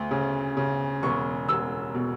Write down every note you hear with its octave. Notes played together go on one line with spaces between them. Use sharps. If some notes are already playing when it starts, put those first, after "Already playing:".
Already playing: D2
C#3
C#3
E1 C#6
E1 E6
B2